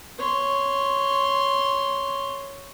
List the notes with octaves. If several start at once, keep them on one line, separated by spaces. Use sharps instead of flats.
C#5 C6